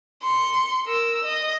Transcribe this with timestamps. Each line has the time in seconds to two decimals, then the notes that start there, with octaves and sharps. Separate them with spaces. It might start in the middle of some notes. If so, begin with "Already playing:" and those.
0.23 C6 C#7
0.85 A#4 E6
1.25 D#5